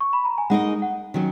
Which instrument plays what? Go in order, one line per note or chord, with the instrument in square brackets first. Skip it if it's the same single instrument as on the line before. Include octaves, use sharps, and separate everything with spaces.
[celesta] C#6
B5
A#5
G#5
[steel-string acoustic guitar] G#3 D#4 A#4 D#5 [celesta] F#5
[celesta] F#5
[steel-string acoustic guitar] D#3 F#3 C#4